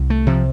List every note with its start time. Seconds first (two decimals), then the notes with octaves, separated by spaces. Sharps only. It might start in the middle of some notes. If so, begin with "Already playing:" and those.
Already playing: C2
0.10 A3
0.27 C3 F3